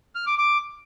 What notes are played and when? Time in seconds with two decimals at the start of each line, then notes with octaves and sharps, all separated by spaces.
0.15 F6
0.27 D6
0.38 D6